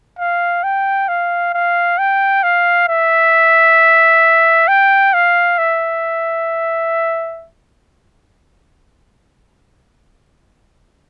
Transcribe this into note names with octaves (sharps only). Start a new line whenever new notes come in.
F5
G5
F5
F5
G5
F5
E5
G5
F5
E5